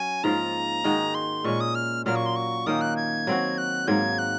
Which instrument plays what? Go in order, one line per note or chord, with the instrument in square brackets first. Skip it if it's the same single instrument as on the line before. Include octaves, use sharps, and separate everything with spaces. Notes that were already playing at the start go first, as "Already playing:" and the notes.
Already playing: [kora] F#3 C#4 F#4 [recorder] G#5
[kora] G#2 F3 A#3 F4 [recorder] A#5
[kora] D#3 G#3 D#4 F#4
[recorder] C6
[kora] A#2 G#3 C#4 [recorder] C#6
[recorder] D#6
F6
[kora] A#2 F#3 A#3 [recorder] F6
[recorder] C#6
C6
C#6
[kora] D#3 A#3 C#4 [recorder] D#6
[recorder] F#6
G#6
[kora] F#3 C4 F#4
[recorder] F#6
[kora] G#2 F#3 A#3 [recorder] G#6
[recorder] F#6